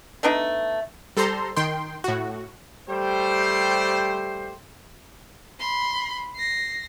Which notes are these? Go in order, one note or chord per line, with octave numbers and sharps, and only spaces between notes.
A3 B3 D4 D#4
G3 A4 C5 A#5 C6
D#3 G5 C6
A2 F#4
G3 A3 G4 C5
B5 C6
A#6 C7